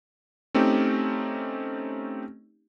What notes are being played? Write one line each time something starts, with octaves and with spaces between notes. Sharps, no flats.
A3 C4 C#4 D#4 G4